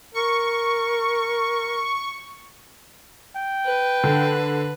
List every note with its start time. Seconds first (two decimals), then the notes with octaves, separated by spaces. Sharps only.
0.14 A#4 C#6
3.36 G5
3.65 B4
4.04 D3